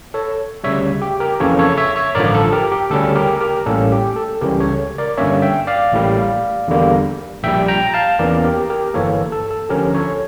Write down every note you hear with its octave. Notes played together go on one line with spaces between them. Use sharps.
A4 C#5
D2 C#3 G3 C#5 E5
G4
G4 A#4
F2 C#3 E3 A#3 C#4 A4 C#5
A4 C#5
C#5 E5
C#5 E5
A1 G2 D3 F3 A#4 D5
A4
G4 A#4
G4
D2 C#3 G3 C#4 A4
G4 A#4
G4 A#4
A1 A2 G3 A#3 C#4 A4
G4
A4
C#2 C#3 E3 G3 C#4 G4 A#4
A4 C#5
A#4 D5
G2 D3 G3 A#3 C#4 C#5 E5
E5 G5
D5 F5
A1 A2 G3 A#3
E2 D3 G3 A#3
A#1 A#2 G3 E5 G5
G5 A#5
F5 A5
E2 E3 A#3 C#4 A#4 D5
G4 A#4
G4 A#4
G1 G2 E3 A#3 A4 C#5
A4
A4
A4
D2 D3 F3 C#4 G4 A#4
A4 C#5